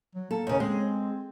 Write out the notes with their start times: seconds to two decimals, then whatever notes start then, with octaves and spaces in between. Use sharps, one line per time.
0.15 F#3
0.31 A#3 A4
0.47 D#2 C#3
0.60 G#3 C4